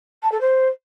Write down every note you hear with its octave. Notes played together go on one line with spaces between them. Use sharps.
A5
A4
C5